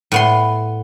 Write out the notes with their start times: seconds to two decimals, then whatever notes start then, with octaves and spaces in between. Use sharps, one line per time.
0.12 A2 B3 C6